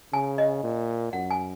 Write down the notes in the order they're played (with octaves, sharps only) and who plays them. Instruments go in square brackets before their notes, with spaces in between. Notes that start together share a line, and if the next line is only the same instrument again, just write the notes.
[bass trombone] C#3 [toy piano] G#5
[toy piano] D#5
[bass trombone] A#2
[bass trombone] F#2 [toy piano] F#5
[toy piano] G#5